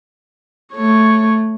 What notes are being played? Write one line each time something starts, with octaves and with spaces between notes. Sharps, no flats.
A3 C#5